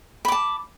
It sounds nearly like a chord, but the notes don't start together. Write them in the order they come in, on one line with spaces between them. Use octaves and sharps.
B5 D6 A5